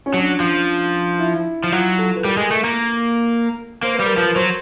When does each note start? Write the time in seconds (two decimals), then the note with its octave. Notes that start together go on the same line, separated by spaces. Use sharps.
0.06 C#4
0.14 F#3 D4
0.40 F3
1.19 E4
1.64 F3
1.72 F#3 F4
1.99 A4
2.16 B4
2.24 G3 A#4
2.37 G#3
2.51 A3
2.64 A#3
3.83 A#3 C5
3.94 B4
4.00 G3
4.06 A#4
4.17 F3 B4
4.36 F#3 C5